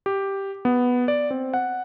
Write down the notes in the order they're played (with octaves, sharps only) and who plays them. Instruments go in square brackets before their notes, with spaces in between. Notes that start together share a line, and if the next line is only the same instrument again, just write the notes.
[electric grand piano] G4
B3
D5
C4
F#5